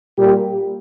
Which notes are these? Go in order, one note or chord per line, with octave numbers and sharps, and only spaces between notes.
A#2 G3 A#3 G4